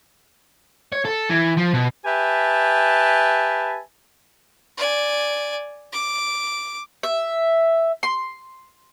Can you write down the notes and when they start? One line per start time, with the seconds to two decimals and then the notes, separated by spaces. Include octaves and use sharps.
0.93 C#5
1.05 A4
1.30 E3
1.57 F3
1.74 B2
2.05 G4 B4 E5 G#5 A5
4.77 D5 G#5
5.93 D6
7.03 E5
8.03 C6